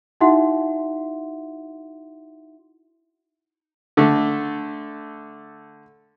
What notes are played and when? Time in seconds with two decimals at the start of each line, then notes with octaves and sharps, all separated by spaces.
0.21 D#4 E4 F#4 E5 F#5 C6
3.97 D3 A3